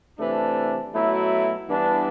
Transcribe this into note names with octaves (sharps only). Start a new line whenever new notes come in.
C3 E3 A3 D4
B2 F#3 A3 E4
G2 E3 B3 D4